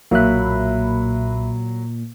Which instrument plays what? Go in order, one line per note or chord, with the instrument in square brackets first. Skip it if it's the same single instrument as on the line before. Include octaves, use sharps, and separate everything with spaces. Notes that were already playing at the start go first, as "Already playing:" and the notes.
[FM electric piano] B1 E5 B5 [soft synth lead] A#2 [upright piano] F#3 [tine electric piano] A#3 F#6